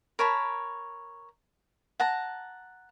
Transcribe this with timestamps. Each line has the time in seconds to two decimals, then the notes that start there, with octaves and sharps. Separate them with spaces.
0.19 A#4 C#5 A5 B5
2.00 F#5 A5 A#5